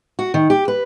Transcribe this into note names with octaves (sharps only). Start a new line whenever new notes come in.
F#4
D#3
G4
B4